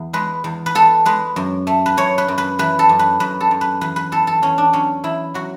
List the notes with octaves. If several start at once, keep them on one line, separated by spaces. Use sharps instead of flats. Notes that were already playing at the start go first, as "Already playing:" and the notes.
Already playing: E2
G#3 B4
E2
B4
B3 A4
G#3 B4
F#2
A3
B4
F#2 C#5
B4
F#2
B4
E3 B4
A4
F#2
B4
F#2 B4
A4
F#2
B4
E2 B4
B4
E2 A4
A4
E2 C#4
D4
F#3 C#4
E2 E4
F#3 F#4